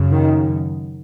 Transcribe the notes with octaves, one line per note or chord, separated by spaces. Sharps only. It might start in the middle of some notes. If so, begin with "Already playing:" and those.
Already playing: F#2 C#3
D#3